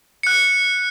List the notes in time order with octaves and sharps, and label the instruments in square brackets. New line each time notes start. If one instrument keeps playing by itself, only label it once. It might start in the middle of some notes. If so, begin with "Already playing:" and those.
[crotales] F#6 C#7